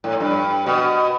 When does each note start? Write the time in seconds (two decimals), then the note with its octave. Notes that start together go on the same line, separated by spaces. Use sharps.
0.04 A2
0.20 G2
0.66 B2